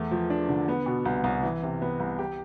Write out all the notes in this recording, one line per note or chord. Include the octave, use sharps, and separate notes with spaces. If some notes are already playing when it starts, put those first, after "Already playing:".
Already playing: E2 A3
F3
D4
D3
B3
B2
C2
C2
E3
C3
B3
C2
G4